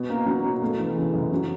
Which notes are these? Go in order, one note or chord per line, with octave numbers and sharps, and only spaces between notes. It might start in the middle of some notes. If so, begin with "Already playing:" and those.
Already playing: B2
A#3
F#3
B2
A3
E3
C#3
F#2
F#3